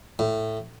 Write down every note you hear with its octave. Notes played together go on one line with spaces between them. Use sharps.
A2